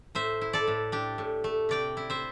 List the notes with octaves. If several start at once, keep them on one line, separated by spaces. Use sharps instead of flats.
A2 C5 E5
E4
A4 D5
A2
D4 G4
A2
A3
C3 D5 G5
E4
C5 E5